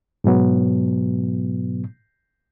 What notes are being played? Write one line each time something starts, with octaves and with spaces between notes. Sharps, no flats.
G#2 B2 F#3 B3